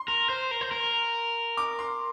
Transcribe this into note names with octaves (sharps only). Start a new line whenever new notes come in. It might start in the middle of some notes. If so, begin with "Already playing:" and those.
Already playing: C6
A#4
C5
A#4
C5
A#4
D6
C6